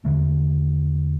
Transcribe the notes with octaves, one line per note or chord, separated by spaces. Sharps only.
E2 D3 A3 D4